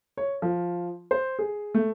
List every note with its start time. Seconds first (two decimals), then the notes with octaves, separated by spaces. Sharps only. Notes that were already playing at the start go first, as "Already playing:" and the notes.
0.17 C#5
0.42 F3
1.11 C5
1.39 G#4
1.75 A3